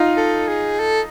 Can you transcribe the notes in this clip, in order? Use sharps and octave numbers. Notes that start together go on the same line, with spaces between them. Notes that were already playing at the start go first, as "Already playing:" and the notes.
Already playing: D#4 F4
A4
G#4
A4